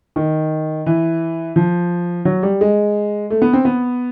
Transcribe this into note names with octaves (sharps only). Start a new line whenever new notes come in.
D#3
E3
F3
F#3
G3
G#3
A3
B3
C4
B3